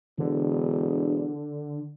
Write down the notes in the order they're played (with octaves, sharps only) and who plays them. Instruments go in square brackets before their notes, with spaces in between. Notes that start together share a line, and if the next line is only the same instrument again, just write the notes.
[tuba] E1 [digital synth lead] D3